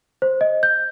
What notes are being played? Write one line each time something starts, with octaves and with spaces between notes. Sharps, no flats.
C5
D#5
G6